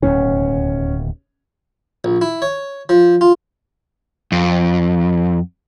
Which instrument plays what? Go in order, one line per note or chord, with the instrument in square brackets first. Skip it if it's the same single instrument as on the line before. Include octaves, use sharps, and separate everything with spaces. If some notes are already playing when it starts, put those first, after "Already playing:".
[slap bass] D1 D#2 B2 [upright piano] C#4
[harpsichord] A#1
E4
C#5
F3
F4
[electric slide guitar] F2